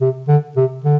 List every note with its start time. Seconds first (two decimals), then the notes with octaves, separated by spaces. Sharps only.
0.01 C3
0.28 D3
0.56 C3
0.84 D3